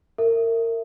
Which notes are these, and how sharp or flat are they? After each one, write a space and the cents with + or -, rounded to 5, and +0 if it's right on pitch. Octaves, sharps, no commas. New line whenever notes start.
A#4 -30 E5 +0